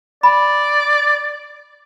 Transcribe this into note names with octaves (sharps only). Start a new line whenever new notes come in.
D5 B5